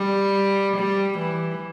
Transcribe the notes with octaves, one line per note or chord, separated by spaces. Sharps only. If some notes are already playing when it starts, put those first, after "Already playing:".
Already playing: G3
G3
E3